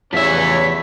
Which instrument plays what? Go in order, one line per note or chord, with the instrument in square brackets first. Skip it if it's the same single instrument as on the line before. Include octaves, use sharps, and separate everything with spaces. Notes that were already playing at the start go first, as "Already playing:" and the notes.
[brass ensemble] A1 C#4 C#5 [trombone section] E2 [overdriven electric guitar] F3 E5 [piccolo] B6